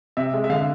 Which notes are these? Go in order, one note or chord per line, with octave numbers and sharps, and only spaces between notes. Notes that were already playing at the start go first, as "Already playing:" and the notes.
C3 E5
G#3
E5
D3 F5